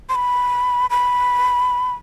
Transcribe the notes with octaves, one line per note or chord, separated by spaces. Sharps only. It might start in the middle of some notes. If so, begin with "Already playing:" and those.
C6
B5
B5